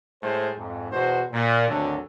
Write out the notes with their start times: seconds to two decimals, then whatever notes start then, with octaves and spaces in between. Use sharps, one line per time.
0.23 A2 G#3 G#4 C5
0.57 F2 G#2
0.92 E2 B2 F#4 C5
1.32 A#2
1.68 G#1 D2 D3 F#3 A4